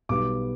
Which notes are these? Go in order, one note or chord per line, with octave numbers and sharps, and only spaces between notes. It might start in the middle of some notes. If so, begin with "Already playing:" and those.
B1 B2 G3 B3 D6